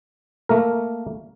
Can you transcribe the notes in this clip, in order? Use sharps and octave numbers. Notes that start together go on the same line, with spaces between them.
A3 A#3 A#4